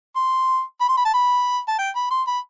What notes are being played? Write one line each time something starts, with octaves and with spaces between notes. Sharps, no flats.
C6
B5
C6
B5
A5
B5
A5
G5
B5
C6
B5